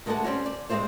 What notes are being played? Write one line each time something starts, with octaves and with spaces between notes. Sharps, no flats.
D2 G#3 A4 D#5 F#5 A5
G3 C4 C#4 F#4
D5
G3 G#3 A#3 C4 F4 C5